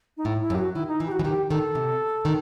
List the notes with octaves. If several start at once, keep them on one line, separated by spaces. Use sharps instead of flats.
D#4
A2 E4
E4
F#2
G4
F#4
D#3 E4
D#4
E3 E4
G4
F#4
E3
D#3 G4
D#3 A4
C3
D#3